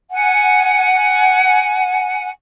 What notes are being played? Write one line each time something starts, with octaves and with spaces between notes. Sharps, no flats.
F#5 G#5